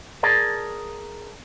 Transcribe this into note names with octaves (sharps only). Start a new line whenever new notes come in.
G#4 A#4 D5 A5